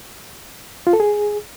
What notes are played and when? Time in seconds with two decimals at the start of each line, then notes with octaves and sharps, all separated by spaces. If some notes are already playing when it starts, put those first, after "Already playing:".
0.87 F4
0.93 A4
1.00 G#4